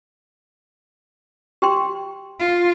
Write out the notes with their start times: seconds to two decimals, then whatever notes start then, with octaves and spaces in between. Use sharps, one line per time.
1.62 G4 G5 C6
2.39 F4